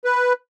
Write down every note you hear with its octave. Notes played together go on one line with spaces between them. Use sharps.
B4